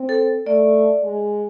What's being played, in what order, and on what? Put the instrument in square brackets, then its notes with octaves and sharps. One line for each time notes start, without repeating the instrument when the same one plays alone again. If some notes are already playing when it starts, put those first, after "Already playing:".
Already playing: [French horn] C4
[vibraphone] A4
[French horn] A3 [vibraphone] D5
[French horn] G#3